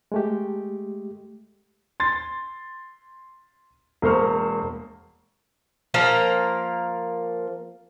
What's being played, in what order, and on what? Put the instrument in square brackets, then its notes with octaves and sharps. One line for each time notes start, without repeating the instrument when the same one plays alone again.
[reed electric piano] G#3 A3 G4
[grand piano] C6 A6
E1 A#3 C5 C#6 F6
[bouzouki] F3 A#3 A#4